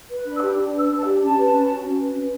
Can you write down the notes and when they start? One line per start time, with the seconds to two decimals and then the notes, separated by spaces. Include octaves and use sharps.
0.10 B4
0.25 D4
0.37 E6
0.41 G4
0.58 D4
0.72 B4
0.78 E6
0.89 D4
0.99 A5
1.04 G4
1.20 C#4 A5
1.37 B4
1.52 C#4
1.68 F#4
1.83 C#4
2.00 B4
2.15 C#4